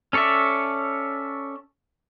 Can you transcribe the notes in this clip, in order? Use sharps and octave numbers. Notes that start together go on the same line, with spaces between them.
C#4 A4 C#5 D5 E5